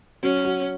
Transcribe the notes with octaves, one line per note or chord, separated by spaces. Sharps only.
F#3 C#4
F#3